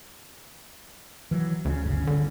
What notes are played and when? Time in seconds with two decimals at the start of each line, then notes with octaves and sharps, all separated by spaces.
1.31 E3 F#3
1.65 D2 C#3
1.85 G1 C#3
2.07 D3